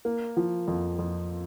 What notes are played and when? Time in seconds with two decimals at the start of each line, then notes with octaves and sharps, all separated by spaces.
0.05 A#3
0.37 F3
0.68 F2
0.99 F2